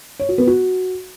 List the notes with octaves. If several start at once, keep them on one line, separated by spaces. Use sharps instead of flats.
C#5
F#4
B3
F#4